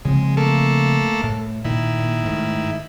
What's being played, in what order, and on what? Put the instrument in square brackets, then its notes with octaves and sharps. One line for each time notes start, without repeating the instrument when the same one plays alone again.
[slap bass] C#3 F3 C4 [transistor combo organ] G#3
[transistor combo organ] A3 A#3 A4
[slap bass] A2
[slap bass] A#2 [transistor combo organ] D#3 E4
[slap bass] A#2
G#2 A3